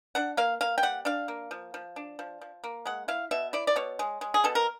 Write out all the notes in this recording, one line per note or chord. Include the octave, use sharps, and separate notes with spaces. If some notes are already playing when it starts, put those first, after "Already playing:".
D4 F#5
A#3 F5
A#3 F5
G5
G3 F#5
D4 F5
A#3
F3
F3
D4
F3
F3
A#3
G#3 F#5
E4 F5
B2 E5
E4 D5
D5
B2 C#5
G#3
G#3
G#4
B2 A4
A#4